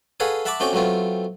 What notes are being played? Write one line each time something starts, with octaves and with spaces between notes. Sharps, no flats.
G#4 A4 B4 C#5 F5 F#5
E5 F#5 A5 B5 C#6 D6
A3 C4 C#4 F#4 D5 G5
F#3 A3 B3 C4 F4